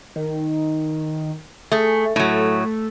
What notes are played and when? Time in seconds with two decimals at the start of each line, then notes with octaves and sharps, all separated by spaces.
0.16 D#3
1.72 A3 G#4
2.16 A2 F#3 A3